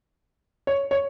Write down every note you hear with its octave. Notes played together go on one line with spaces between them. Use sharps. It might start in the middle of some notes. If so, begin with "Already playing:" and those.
C#5
C#5